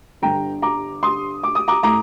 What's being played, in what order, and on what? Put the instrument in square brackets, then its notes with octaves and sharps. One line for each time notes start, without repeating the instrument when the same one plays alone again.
[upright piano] G1 G2 D3 G5 A#5
A#5 D6
C6 D#6
D6
D#6
A#5 D6
A2 A3 A#5 D6